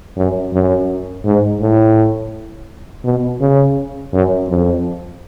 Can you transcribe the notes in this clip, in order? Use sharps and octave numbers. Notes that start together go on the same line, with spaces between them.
F#2
F#2
G#2
A2
B2
C#3
F#2
F2